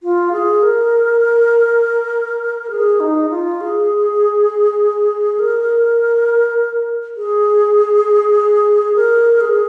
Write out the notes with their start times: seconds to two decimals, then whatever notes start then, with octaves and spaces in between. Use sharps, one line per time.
0.03 F4
0.32 G#4
0.62 A#4
2.70 G#4
3.00 D#4
3.30 F4
3.60 G#4
5.39 A#4
7.17 G#4
8.95 A#4
9.40 G#4